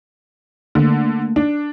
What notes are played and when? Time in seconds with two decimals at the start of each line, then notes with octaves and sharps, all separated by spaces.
0.75 D3 A3 A#3
1.36 D4